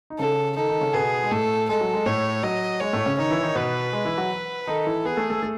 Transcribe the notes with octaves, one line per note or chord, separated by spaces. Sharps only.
D#4
C#3 C#4 A4
D#3 D#4 A4
D#3 D#4
C#3 C#4
B2 B3 G#4
G#3
A2 A3 A4
G#3 A4
F#3
G#3
A2 A3 C#5
F#3 D#5
G#3 C#5
A2 A3
C#3 C#4
D#3 D#4 C#5
E3 E4
D#3 D#4
B2 B3 B4
G#3
E3 E4
F#3 F#4
D#3 D#4 A4
E3 E4
B3 G#4 B4
A3 A4
A3 A4
A3 A4